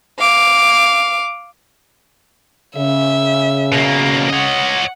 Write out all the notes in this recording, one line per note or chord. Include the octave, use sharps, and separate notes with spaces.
F5 D6
C#3 E5
B2 A#3
C#5 D#5 F#5